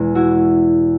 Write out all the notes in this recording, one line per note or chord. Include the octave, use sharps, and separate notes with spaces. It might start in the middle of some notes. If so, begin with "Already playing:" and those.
Already playing: E2 B2 G#3
E4 F#4